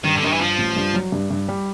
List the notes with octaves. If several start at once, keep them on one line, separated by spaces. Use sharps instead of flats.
G2 D#3
D3
G2 D#3
E3
G2 F3
A1
G2
F#3
G2
G2
G3